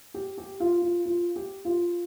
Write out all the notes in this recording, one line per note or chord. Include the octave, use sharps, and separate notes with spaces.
G4
G4
F4
F4
F4
G4
F4